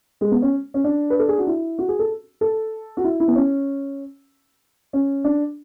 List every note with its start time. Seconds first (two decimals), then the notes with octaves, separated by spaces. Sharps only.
0.21 G#3
0.31 B3
0.42 C#4
0.74 C#4
0.84 D4
1.10 B4
1.19 A4
1.28 G#4
1.38 F#4
1.47 E4
1.79 F#4
1.89 G#4
1.99 A4
2.41 A4
2.97 F#4
3.04 E4
3.20 E4
3.28 B3
3.36 C#4
4.93 C#4
5.24 D4